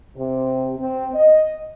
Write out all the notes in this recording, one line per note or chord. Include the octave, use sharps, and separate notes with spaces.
C3
C4
D#5